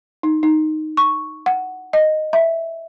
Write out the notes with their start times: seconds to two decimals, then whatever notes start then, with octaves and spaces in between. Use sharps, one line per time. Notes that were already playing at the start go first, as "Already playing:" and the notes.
0.23 D#4
0.43 D#4
0.97 C#6
1.46 F#5
1.93 D#5
2.33 E5